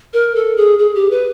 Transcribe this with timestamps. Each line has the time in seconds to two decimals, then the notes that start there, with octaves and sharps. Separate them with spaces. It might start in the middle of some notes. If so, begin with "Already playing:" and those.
0.13 A#4
0.36 A4
0.57 G#4
0.79 G#4
0.95 G4
1.11 B4